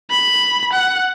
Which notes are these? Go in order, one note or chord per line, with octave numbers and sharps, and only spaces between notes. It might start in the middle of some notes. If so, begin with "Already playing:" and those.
B5
F#5